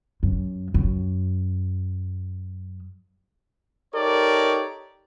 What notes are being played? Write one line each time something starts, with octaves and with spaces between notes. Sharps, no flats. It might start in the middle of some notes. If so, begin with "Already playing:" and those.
F#2
F#2
D#4 G4 A4 A#4 C#5 D5